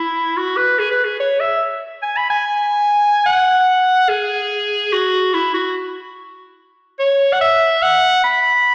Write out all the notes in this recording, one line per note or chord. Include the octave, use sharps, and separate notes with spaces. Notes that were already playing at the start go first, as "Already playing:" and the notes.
Already playing: E4
F#4
B4
G#4
B4
G#4
C#5
E5
G#5
B5
G#5
F#5
G#4
F#4
E4
F#4
C#5
F#5
E5
F#5
B5